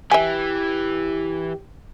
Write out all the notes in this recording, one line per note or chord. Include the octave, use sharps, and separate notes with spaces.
E3 G4 E5 G#5